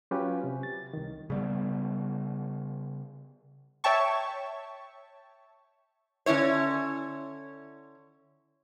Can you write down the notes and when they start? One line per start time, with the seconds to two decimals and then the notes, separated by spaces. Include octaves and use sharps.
0.11 F#3 C#4 F4 G4 B4
0.44 C3
0.63 A6
0.93 C2 D#3
1.30 C#3 G3 B3
3.84 C#5 E5 G5 A5 C#6
6.26 D3 C#4 E4 C#5